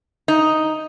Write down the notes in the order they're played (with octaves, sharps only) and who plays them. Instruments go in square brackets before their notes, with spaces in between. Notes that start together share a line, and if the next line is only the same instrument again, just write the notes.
[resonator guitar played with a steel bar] D#4